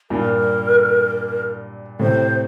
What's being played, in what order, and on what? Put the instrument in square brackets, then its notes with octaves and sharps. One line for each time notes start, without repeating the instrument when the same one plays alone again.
[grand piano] G2 A#2 [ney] A#4
[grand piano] A2 C3 [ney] C5